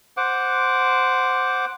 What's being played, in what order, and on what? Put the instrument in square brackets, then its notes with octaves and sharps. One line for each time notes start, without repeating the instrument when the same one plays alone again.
[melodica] C5 F#5 D6